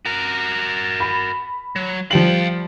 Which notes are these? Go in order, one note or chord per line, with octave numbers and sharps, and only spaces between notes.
F#4 A#4
B5
F#3
F3 G3 F5 G5 F#7